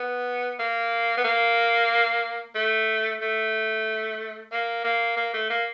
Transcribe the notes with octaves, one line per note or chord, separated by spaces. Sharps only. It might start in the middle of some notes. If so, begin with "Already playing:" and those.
Already playing: B3
A#3
B3
A#3
A3
A3
A#3
A#3
A#3
A3
A#3